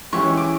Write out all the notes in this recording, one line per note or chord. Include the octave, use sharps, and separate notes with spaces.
E3 G#3 C#4 E4 G4 C#6
D6